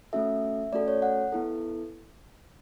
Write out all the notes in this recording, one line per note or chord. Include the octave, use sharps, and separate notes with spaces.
A3 C#4 F#4 A4 E5
A3 C#4 F#4 A4 D5
C#5
F#5
B3 E4 A4